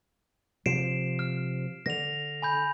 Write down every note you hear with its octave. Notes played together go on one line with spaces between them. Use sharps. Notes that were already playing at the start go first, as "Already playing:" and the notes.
C3 F3 C7 D7 E7
F6
D3 A#6 F7
G#5 B5 G6